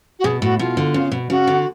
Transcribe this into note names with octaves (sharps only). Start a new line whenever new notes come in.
F#4
B2 G#4
A2 F#4
B2 F4
D3
C#3
B2
C#3 F#4
D3